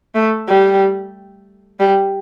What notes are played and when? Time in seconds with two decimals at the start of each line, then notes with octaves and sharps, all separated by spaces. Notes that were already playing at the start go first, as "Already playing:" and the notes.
0.15 A3
0.48 G3
1.80 G3